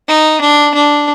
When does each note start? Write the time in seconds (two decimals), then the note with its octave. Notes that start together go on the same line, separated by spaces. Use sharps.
0.09 D#4
0.41 D4
0.75 D4